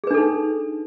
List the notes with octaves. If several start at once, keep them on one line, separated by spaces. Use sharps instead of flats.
D4 D#4 G#4 A4 B4